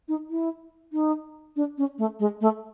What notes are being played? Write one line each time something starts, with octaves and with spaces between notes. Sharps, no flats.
D#4
E4
D#4
D4
C#4
A3
G#3
A3